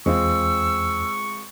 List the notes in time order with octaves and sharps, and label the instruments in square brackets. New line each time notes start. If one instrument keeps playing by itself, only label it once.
[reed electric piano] E2 [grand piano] G#3 C4 F4 [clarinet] C#6 [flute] E6